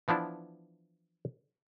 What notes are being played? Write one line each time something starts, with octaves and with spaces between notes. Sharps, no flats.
E3 F3 B3 D4 E4